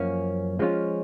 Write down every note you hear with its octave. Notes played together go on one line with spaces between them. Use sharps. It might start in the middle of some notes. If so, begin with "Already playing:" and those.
Already playing: F#2 F3 A#3 C#4
F3 G#3 C#4 F4